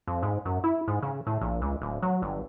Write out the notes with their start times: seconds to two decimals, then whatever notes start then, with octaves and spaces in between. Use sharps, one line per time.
0.07 F2
0.23 G#2
0.45 F#2
0.64 E4
0.88 G#2
1.02 C#3
1.27 A2
1.41 A#1
1.62 C#2
1.82 D1
2.02 F#3
2.22 G1